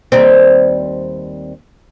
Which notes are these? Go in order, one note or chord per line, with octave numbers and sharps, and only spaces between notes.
D#2 G3 C4